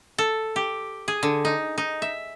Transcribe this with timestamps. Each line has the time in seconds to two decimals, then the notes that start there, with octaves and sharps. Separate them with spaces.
0.18 A4
0.56 G4
1.08 G#4
1.23 D3
1.45 D#4
1.78 D#4
2.02 E5